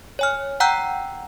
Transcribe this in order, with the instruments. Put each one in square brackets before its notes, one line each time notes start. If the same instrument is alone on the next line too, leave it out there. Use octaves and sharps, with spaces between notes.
[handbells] C#5 G#5 F6
F#5 G5 A#5 E6 F#6 G6